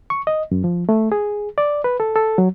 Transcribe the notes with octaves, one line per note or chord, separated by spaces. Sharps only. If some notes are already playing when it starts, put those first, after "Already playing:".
C#6
D#5
F#2
F3
A3
G#4
D5
B4
A4
A4
F#3